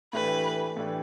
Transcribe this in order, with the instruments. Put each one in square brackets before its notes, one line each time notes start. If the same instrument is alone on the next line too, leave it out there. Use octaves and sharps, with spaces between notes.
[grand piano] A2 E3 A3 D4 G4 [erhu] B4
[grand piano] A2 E3 A3 D4 G4